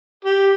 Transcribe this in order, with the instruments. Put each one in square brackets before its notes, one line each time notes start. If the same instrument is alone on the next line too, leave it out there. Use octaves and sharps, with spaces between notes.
[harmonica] G4